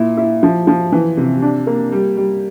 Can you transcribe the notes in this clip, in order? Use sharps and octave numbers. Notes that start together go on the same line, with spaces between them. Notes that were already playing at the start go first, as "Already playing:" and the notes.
Already playing: A#2 E4
E4
F3
F3
E3
C3
D4
A#3
G3
G3